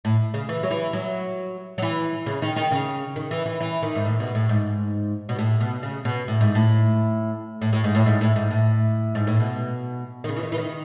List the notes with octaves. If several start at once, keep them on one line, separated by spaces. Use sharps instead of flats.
A2
C#3
E3
F#3
E3
F#3
F#3
E3
C#3
D#3
D#3
C#3
D#3
E3
E3
E3
D#3
G#2
A2
B2
A2
G#2
B2
A2
B2
C#3
B2
A2
G#2
A2
A2
A2
G#2
A2
G#2
A2
G#2
A2
G#2
A2
B2
D#3
C#3
E3
D#3
E3
D#3